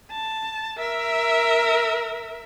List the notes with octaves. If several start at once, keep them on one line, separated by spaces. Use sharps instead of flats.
A5
A#4 E5